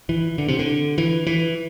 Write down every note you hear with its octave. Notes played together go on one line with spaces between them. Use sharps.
E3
D3
C3
D3
E3
E3